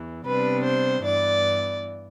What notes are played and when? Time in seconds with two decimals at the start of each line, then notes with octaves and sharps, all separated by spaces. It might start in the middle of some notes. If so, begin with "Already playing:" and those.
Already playing: E2 E3
0.25 C3 G3 B3 D4 B4
0.65 C5
1.05 G2 E3 B3 D5